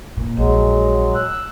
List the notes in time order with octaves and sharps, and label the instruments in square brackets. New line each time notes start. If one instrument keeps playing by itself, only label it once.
[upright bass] A#2
[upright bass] A#1 [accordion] F#3 G#3
[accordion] E6 F#6